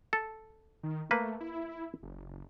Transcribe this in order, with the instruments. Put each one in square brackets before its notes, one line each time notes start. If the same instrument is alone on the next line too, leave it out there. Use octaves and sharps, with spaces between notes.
[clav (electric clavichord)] A4
[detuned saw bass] D#3
[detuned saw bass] A3 [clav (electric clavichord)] A#3 B4
[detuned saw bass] E4
F#1